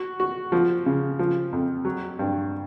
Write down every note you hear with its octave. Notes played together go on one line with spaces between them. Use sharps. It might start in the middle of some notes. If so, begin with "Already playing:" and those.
Already playing: F#4
F#4
F3
C#3
F3
F2
F#3
G2